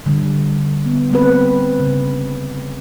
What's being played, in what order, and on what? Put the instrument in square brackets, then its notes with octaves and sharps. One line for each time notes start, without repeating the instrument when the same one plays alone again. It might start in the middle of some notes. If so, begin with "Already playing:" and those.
[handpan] D3 G3
B3
G3 A#3 C4 B4
C#3